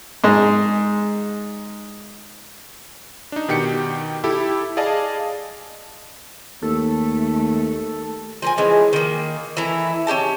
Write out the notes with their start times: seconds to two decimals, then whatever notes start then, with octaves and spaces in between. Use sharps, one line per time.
0.24 G#2 G#3
3.32 D4 D#4
3.48 B2 D#3 G4 G6 C#7
4.24 E4 G4 A4
4.77 G#4 D5 D#5 F5 A5
6.62 D#2 A3 A4
8.42 F3 A#4 G#5
8.58 E3 F3 G#3 C#4
8.93 D#3 A#3
9.57 E3 A3 E4 A#5
10.07 C#4 D4 G4 A5